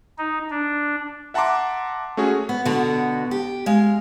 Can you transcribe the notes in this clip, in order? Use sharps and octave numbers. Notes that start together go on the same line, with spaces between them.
D#4
D4
E5 F#5 A5 A#5 C6 D6
A3 C#4 F#4 G#4
B3
B2 D3 B3 F#4
G4
G#3 F5